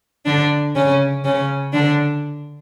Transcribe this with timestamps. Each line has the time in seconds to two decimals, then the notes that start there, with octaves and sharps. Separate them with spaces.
0.26 D3 D4
0.75 C#3 C#4
1.24 C#3 C#4
1.73 D3 D4